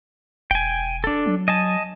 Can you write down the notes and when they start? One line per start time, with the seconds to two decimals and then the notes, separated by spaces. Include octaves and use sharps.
0.51 E1 G5 G#5
1.04 D4 A4
1.26 F#3
1.48 D#5 G#5 A5